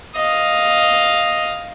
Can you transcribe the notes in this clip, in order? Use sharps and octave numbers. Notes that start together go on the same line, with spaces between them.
D#5 F5